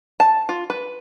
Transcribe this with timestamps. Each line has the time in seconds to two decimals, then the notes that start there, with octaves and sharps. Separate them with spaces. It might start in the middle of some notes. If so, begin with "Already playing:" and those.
0.20 A5
0.49 F4
0.70 B4